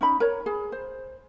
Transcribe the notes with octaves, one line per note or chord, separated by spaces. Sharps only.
C#4 D#4 B5
A#4 C#5
G#4
C5